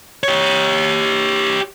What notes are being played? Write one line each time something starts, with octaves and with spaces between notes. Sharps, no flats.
G4 C#5